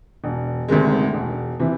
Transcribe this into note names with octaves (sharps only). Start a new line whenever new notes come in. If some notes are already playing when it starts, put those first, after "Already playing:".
E1
D2 C3 D#3 G#3
E1
C3 E3